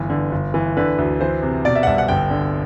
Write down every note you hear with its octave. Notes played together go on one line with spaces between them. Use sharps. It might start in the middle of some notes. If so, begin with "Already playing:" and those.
Already playing: G1 E3
D3
G1
E3
D3 B4
D2
E3 C5
C3
B2 D5
E5
F#5
C2 E5
F#5
G1 G5
D3